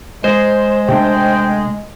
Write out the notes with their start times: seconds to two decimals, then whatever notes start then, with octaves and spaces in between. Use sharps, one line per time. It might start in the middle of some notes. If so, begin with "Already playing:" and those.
0.24 G#3 C5
0.88 C3 A3 D4 G5